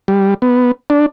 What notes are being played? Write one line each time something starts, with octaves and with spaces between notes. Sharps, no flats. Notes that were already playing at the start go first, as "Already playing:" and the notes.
G3
B3
D4